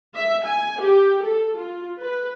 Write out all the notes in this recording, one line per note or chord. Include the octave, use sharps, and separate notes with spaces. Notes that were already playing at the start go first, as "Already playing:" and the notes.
E5
G#5
G4
A4
F4
B4